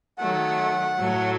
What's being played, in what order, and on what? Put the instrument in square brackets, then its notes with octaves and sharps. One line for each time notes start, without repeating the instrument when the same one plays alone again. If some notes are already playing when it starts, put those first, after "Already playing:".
[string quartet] D#3 F#3 A3 [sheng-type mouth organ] F#5
[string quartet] A2 F#3 A3